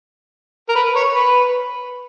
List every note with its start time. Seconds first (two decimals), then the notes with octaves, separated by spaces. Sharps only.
0.69 A#4
0.75 B4
0.96 C#5
1.15 B4